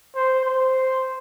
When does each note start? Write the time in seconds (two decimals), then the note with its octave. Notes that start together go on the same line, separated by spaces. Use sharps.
0.15 C5
0.45 C5